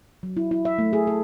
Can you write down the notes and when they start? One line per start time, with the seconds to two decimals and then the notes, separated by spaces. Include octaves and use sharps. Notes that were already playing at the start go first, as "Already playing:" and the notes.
0.23 F#3
0.37 E4
0.51 E4
0.65 E5
0.79 A3
0.93 G#4
1.07 A4